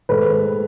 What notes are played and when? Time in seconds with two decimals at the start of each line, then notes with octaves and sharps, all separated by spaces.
0.09 G#2 D#3 A3 B4